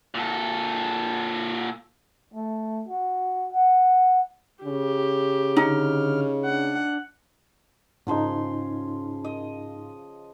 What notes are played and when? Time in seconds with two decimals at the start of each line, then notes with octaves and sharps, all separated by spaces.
0.15 A#2 A4
2.34 A3
2.88 F#4
3.53 F#5
4.64 C#3 G4
5.56 D3 D#4 F6
6.45 D4 F#5
8.07 G#2 C#3 F3 D#4 C6
9.25 D#5